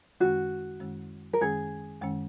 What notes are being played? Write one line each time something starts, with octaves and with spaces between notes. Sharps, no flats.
F#2 D#3 G#3 C#4 F#4
F#2 D#3 G#3 C#4
A#4
F#2 D#3 G#3 C#4 G#4
F#2 D#3 G#3 C#4